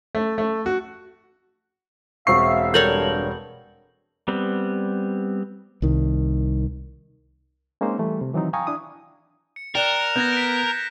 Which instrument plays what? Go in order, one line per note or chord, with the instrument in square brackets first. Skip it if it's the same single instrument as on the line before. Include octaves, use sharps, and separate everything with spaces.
[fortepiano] A3
A3
F#4
[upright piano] E1 C4 C7 [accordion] E5 F5 [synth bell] C#6
[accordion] G2 [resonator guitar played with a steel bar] A4 A#4 C#5 [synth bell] G6 F#7
[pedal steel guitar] G3 B3 C4
[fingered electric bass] C2 D#3
[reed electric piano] G#3 A#3 C4 C#4 D#4 C5
E3 G3 A3
C3
D#3 E3 F#3 C4 D#4
F5 G5 G#5 A#5 C#6 D#6
D4 E4 D#6
[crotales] C#7
[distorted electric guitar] A#4 [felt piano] D5 G5 [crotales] F#6 E7 G7
[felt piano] B3 [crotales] G6 G#6 A#6
[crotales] B6 D7